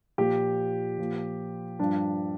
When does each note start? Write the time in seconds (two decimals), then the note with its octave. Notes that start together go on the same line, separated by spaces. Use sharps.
0.18 A#2 F3 G4
0.98 A#2 F3
1.79 G2 F3 D4